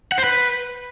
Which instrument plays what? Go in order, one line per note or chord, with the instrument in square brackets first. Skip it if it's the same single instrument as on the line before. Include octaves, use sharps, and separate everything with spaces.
[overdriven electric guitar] F#5
C5
B4